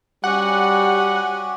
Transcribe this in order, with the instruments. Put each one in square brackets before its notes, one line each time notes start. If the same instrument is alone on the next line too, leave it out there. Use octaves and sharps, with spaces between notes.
[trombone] G3 [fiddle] C#4 G#5 [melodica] F#4 G4 [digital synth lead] F#5